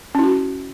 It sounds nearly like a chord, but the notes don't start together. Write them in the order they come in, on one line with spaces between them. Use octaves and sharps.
C#4 E4 F#4